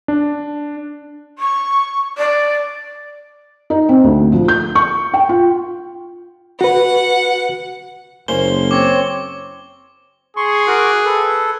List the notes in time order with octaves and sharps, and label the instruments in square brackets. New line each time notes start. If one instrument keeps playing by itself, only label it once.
[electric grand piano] D4
[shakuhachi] C#6
D5
[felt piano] D#4
C4
D2
F3
G6
C#6
G5
F4
[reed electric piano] F#4 B4 [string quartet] F#5
[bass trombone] F#1 [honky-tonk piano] A#3 C#4 C5 [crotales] G7
[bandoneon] C4 C#5 [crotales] D6
[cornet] G#4 [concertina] C6 C#6
[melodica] F#4 A#4 D6 [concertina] F#6
[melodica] A4 [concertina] B4